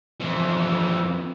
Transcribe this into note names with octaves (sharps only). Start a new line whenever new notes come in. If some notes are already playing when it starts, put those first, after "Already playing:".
F2 E3